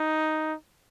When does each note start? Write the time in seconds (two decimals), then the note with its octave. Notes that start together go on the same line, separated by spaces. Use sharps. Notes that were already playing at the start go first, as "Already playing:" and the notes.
Already playing: D#4